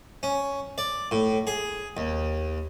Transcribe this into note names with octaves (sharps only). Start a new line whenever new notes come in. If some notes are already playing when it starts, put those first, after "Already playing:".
C#4
D5
A2
G#4
D#2